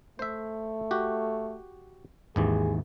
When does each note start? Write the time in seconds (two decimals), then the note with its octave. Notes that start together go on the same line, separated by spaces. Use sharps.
0.19 A3 C5 E5
0.91 F#4 G4
2.36 G#1 D#2 E3 G#4